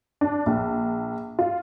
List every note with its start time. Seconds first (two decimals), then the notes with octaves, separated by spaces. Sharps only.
0.21 D4
0.46 A#1
1.39 F4